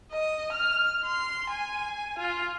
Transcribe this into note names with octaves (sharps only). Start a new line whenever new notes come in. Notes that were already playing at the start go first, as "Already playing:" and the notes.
D#5
F6
C6
G#5
F4